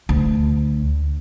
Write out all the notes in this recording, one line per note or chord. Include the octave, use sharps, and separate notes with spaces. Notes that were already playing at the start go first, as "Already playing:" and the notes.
D2